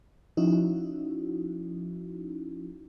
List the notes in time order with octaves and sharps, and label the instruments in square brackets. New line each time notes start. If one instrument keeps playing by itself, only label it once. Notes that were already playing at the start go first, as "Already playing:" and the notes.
[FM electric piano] F3 C#4 D#4 E4 F#4